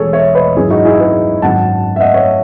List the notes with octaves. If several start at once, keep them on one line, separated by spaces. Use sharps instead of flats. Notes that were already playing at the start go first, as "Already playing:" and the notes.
Already playing: E1 E2 B2 G#4 A4 C#5
C#5 E5
B4 D#5
G#1 F#2 D#3 E4 G#4
D#4 F#4
E4 G#4
G#4 B4
G#1 F#2 D#3 F#5 A5
E5
D#5 F#5
C#5 E5